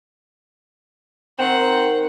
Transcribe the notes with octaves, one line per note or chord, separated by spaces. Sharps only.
D#3 C4 F#5